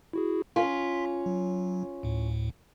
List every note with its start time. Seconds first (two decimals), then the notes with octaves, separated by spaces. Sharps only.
0.13 E4 F#4 G#4
0.56 C#4 F4 C6 B6
1.26 F#3
2.03 D2 A2